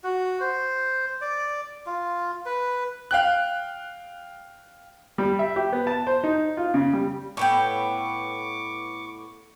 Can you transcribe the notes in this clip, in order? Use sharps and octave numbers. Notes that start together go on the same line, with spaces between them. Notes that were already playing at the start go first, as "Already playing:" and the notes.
F#4
C5
D5
F4
B4
F5 G5 F#6
G3
E5
G4
B3
A5
C5
D#4
F4
C#3
G3
A2 B3 G5 C#6 D6